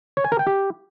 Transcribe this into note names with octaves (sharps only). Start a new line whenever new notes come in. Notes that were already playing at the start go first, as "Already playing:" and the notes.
C#5
G#5
A#4
G5
G4